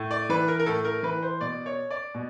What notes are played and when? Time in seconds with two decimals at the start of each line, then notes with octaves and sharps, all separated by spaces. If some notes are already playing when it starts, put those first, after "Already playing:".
Already playing: A2
0.11 D5
0.29 E3 B4
0.48 A#4
0.60 A#4
0.66 A2 A4
0.85 A#4
1.03 E3 B4
1.22 C5
1.41 B2 D5
1.66 C#5
1.91 D5
2.15 B2